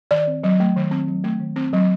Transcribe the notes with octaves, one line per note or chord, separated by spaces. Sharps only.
D#3 D5
C4
F#3
A3
D#3
C4
F#3
A3
D#3
C4
F#3